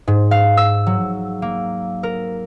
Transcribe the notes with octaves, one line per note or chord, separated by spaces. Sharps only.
G#2
F5
E6
F#3
A#3
A#4